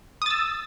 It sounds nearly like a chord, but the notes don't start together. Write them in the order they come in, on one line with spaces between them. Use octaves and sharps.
D#6 A6 E6